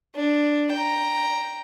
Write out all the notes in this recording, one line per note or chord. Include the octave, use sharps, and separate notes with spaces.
D4
G5 A#5